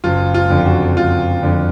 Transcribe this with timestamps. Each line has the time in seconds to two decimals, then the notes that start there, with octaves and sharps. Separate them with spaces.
0.04 F#1 F4
0.34 F4
0.50 F2 D3
0.66 F#4
0.96 F#1 F4
1.43 F2 D3